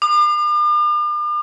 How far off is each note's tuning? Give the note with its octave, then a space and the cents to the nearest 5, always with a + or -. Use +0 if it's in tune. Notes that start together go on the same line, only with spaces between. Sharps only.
D6 +45